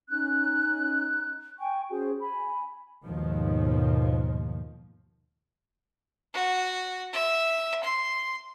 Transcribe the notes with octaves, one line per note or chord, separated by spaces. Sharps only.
C#4 D#4 F#6
G5 G#5 C#6
C#4 F#4 G#4 C5
G#5 B5
D#2 G#2 B2 D#3 F3
F#4
E5
C6